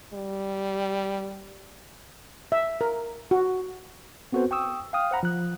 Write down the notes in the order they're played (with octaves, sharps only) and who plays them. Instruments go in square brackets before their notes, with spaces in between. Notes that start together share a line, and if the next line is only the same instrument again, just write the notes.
[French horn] G3
[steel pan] E5
A#4
F#4
[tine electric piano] B3 C4 F#4 A4 B4 C5
G5 C#6 D#6 E6
F5 G5 D#6 F6
C5 F#5 A#5 B5
F3 F#6